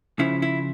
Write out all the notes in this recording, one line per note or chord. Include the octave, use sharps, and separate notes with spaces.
C#3 F3 E4
E4